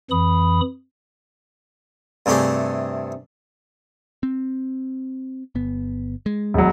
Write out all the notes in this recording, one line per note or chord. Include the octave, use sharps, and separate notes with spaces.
F2 E3 B5 D#6
G2 C3 A3 G4 G#4
C4
G1 B3
G#3
E1 F#3